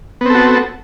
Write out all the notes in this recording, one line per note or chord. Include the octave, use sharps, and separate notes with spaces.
B3 C4 F#4 A4